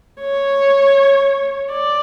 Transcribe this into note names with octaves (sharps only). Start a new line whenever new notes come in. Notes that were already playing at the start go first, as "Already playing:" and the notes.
C#5
D5